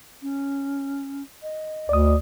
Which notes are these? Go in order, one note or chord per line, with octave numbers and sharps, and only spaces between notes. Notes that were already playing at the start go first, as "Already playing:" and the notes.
C#4
D#5
D2 D5 D#6